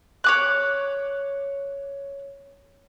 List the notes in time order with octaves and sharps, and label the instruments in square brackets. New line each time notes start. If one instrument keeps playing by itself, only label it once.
[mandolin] C#5 D6 F#6